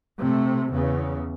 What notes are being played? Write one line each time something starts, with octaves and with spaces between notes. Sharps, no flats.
C3 A3
E2 C#3